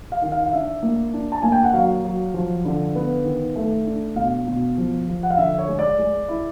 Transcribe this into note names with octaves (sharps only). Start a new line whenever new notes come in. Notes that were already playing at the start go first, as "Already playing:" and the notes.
F5
D#3
F5
F5
D4 E5
A#3
D4
A5
A#3 G#5
G5
F#5
F#3 F5
F#3
F3
D3
B3
D#3
A3
D4
B2 F5
B2
F3
F3
F#5
F5
D3 E5
C#5
G#3
D5
G#3
E4